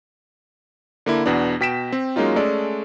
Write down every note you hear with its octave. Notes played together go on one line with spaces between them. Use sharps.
D3 A#3 E4
E2 B2 B3 D4
B2 G5 B6 D7 E7
C4
F#3 G#3 A#3 C#4 D#4 F4
G#3 A3 C#4 A4 D5